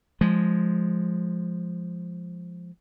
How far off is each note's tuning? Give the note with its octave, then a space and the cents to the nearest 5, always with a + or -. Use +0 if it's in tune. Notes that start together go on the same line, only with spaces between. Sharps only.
F3 +0 G#3 +0